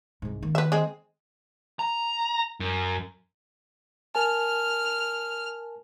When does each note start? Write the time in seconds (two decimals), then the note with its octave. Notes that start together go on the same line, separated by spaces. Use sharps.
0.22 C2 G#2
0.42 D#3 A#3
0.55 B4 E5
0.72 G#3 C4 G#4
1.79 A#5
2.60 F#2
4.15 A#4 G#5 A5 F6